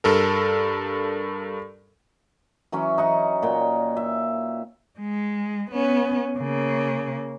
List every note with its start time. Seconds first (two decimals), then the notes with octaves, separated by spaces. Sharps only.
0.04 G2 A4 A#4
2.72 E3 F#3 C#4
2.98 D#4 F#5 C#6
3.42 A#2 G5
3.97 E5
5.00 G#3
5.71 B3 C#4
6.39 C#3 A#3